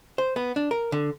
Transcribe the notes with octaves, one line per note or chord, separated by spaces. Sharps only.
C5
B3
D4
A#4
D3